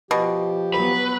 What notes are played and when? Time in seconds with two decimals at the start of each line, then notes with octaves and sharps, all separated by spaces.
0.11 B2 F3 G4
0.74 F#3 B3 B4